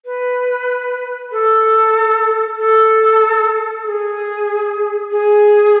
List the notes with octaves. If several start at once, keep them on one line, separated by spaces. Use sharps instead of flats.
B4
A4
A4
A4
G#4
G#4